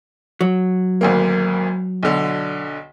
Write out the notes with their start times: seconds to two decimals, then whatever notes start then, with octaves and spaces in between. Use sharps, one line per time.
0.41 F#3
1.01 G#1 D2 A#3
2.03 B1 D3